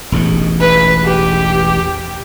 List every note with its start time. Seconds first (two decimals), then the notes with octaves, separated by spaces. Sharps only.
0.12 E1 A1 G#2
0.60 B4
1.05 G4